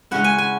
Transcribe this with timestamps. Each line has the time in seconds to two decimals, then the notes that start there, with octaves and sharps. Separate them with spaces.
0.11 C#3 G#3 C#4 E4 F#5
0.24 G#5
0.38 G#5